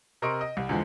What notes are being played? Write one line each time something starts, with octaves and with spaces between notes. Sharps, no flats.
C3 A#4 D#5 C6 C#6 D7
D#5
C2
E2 D3 F3 G#3